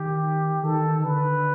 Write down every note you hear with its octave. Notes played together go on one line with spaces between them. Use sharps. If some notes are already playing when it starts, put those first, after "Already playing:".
Already playing: D#3 G4
D#3 A4
D#3
D3 B4